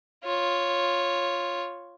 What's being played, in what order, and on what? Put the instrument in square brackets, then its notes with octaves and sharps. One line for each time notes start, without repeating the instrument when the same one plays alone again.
[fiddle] F4 C#5